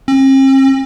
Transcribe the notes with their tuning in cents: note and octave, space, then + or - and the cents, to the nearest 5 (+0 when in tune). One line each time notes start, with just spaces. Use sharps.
C4 +45